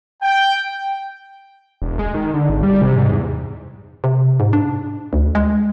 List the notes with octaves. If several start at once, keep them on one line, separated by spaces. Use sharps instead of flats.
G5
E1
G#3
D#3
D3
G#1
G3
C3
G#2
E2
C3
G#2
D4
D2
G#3